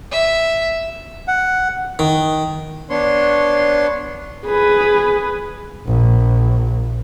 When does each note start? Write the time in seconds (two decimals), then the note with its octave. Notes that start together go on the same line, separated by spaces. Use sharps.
0.12 E5
1.28 F#5
1.99 D#3
2.90 B3 D4 C#5 C6
4.46 G#4 B4
5.87 A#1